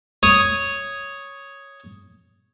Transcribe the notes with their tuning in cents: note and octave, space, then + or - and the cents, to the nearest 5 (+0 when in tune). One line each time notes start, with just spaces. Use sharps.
C#5 +0 D#6 +0